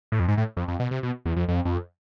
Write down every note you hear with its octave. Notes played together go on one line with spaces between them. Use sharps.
A2
F2
G#2
A2
F2
F2
B2
C3
B2
E2
F2
F2
F2